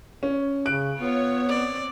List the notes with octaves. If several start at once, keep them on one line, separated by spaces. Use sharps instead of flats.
C#4
C#3 F#6 D7
B3 F4 C#5
C4 D5